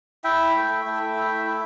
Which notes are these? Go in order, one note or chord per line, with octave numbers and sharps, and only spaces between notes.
E4 E5 G5
A3
A3
E4
E4